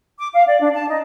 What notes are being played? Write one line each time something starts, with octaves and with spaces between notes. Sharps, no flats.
D6
F5
D5
D4
A5
D#4